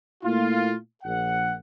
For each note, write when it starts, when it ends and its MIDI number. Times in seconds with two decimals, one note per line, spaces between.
0.24 0.74 46
0.24 0.74 57
0.24 0.74 58
0.24 0.74 64
0.24 0.74 65
1.04 1.54 34
1.04 1.54 78